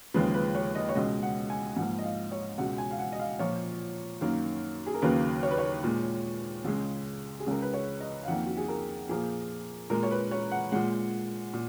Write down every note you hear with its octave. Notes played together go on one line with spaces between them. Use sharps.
D#2 C#3 F3 G#3 B4
B4
C#5
D#5
C#5
C#2 B2 G#3 D#5
F#5
G#5
G#2 F3 A#3 F#5
D#5
F5
C#5
C#2 B2 G#3 F#5
G#5
F5
F#5
D#5
F5
A#2 F3 A#3 C#5
F#2 D#3 A#3
G#4
A#4
D#2 C#3 F#3 A#3 B4
C#5
B4
C#5
A#2 G#3
C#2 C#3 G#3
G#4
C#2 C#3 G#3 A#4
B4
C#5
D#5
F5
F2 D#3 A#3 F#5
F#4
G#4
A#4
A#2 F3 A#3 G#4
A#2 G#3 A#4
C#5
B4
C#5
F#5
A#2 G#3 F#5
A#2